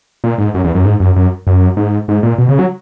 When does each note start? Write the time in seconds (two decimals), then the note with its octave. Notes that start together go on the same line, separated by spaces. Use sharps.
0.24 A#2
0.38 G#2
0.54 F#2
0.64 E2
0.75 F#2
0.85 G#2
1.00 F#2
1.16 F#2
1.47 F#2
1.77 G#2
2.08 G#2
2.23 A#2
2.38 B2
2.49 C#3
2.59 F#3